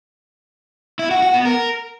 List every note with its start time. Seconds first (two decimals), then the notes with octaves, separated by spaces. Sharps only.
0.99 E4
1.11 F#4
1.22 F#4
1.34 B3
1.45 A#4